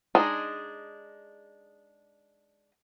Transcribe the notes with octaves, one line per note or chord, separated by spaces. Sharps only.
G#3 D4 D#4 G#4